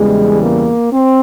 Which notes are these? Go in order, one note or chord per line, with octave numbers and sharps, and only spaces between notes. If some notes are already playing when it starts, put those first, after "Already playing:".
Already playing: E2 C#3 E3 G3 G#3
A#3
C4